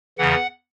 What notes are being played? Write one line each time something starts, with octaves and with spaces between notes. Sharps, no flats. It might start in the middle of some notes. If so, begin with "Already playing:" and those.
E2 C#3 E3 F#5